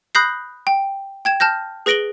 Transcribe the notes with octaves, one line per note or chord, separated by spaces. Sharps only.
B5 D#6 F#6 G6 A#6 C7
G5
G5 G#6 E7
A5 F6 G6 A#6
G#4 B4 A#6 D7 F#7 G7